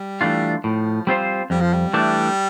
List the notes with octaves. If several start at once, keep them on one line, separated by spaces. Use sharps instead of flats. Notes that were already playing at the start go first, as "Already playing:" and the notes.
Already playing: G3
E3 A3 D4 F4
A2 F3
G3 C4 F4 C5
F2 G3
F3
G3
E3 A3 D4